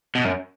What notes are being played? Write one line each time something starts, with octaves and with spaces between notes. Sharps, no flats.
B2
F#2